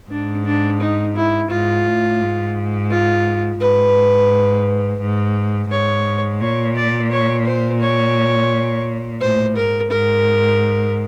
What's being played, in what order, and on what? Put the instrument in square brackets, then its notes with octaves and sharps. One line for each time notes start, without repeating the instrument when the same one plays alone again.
[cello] G#2 [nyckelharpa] D4
[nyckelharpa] D4
D#4
E4
[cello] G#2 [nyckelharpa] F4
[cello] A2
G#2
[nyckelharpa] F4
[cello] G#2 [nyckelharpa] B4
[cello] G#2
[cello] G#2 [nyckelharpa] C#5
[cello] A#2 [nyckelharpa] C#5
[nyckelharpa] D5
C#5
C5
C#5
[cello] A2 [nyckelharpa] C5
[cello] G#2 [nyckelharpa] A#4
[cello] G#2 [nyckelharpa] A#4